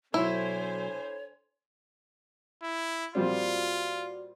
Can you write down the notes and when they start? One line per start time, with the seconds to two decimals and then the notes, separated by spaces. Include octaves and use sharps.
0.14 B2 D3 F#3 E4 C5 C#5 G#5
2.62 E4
3.15 A#2 G3 C4 F4 F#4 D5